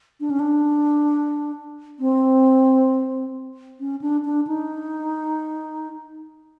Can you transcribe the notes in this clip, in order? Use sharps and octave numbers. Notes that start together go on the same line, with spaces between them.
D4
C#4
D4
C4
C#4
D4
D4
D#4